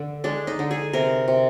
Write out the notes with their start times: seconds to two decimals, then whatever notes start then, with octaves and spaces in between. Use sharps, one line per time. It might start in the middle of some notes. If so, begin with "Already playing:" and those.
Already playing: D3
0.24 G#3 D4
0.47 D#4
0.59 D3
0.71 G#4
0.93 C3 A#4
1.28 C3